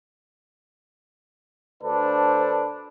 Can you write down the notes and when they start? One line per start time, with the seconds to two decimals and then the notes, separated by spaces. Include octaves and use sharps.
1.84 D2 D4 A4 B4 C5